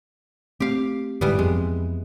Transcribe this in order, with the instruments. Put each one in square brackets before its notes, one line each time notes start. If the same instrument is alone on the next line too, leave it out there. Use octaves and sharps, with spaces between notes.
[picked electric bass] A3 C4 [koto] G4 F5
[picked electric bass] G1 G#2 [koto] E3 G3 B3
[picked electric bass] F2 [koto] G#3